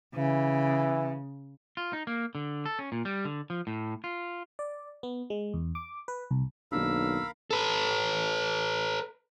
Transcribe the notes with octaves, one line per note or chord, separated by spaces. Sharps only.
C#3 E3
F4
D#4
A#3
D3
A4
C#4
A#2
G3
D3
F3
A2
F4
D5
B3
G#3
E2
D6
B4
C2
B1 D#3 A#3 D4 A#4 F5 B5 E6
A4 B4